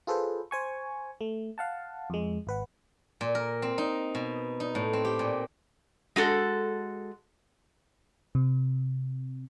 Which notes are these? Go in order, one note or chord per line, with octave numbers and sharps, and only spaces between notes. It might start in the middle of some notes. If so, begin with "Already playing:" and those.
F4 G#4 A4 B4 C5
C5 G#5 C#6
A3
F5 F#5 A5
F2 G#3
G#1 B4 F#5
A#2
A#4
C4
D#4
B2
D#4
A2
C4
G4
A#2
G#3 F#4 A4
C3